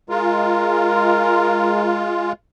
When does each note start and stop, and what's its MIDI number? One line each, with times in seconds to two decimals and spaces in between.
0.10 2.32 56
0.10 2.32 65
0.10 2.06 70